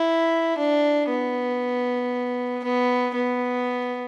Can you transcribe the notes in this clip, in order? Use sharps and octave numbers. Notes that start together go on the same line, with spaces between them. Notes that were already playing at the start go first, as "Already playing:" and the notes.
Already playing: E4
D4
B3
B3
B3